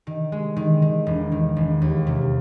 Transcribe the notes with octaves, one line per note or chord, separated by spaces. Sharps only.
D#3
G#3
D#3
D#3
E1
D#3
E1
D#2
C3